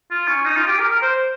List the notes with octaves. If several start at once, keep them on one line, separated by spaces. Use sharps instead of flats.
F4
C#4
D#4
F4
G4
A#4
A#4
C5